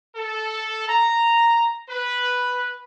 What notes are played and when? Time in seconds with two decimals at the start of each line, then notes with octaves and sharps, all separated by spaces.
0.15 A4
0.88 A#5
1.87 B4